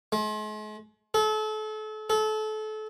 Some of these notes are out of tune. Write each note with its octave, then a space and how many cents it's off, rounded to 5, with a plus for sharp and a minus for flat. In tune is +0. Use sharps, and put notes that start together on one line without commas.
G#3 +45
A4 -35
A4 -30